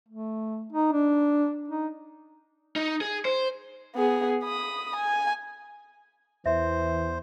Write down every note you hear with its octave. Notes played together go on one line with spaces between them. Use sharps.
A3
D#4
D4
D#4
D#4
G#4
C5
B3 G#4
B5 D#6
G#5
E2 E3 C5 E5